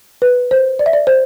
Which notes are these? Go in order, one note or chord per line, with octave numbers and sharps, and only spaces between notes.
B4
C5
D5
E5
D5
C5